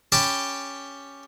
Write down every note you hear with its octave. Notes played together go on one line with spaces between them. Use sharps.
C#4 G4 G5 A5 B5